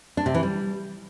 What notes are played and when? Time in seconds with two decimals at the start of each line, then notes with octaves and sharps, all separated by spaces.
0.17 D4
0.26 C3
0.34 E3
0.43 G3